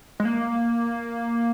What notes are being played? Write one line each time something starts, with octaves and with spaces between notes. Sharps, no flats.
G#3
A#3